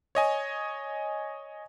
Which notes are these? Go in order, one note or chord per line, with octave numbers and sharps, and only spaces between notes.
C#5 D#5 G#5